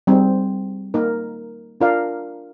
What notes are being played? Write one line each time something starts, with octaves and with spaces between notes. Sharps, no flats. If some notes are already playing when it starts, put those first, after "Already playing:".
G3 C4 D#4 G#4
A#3 D#4 A#4
D4 F4 A#4 D5 F5